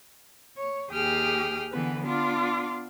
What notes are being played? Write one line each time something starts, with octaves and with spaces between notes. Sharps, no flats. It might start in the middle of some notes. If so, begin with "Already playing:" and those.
C#5
D#2 G4 G#4 G5 D#6 F6
D3 E3 B3 B4
B3 D4 F4 C6 D6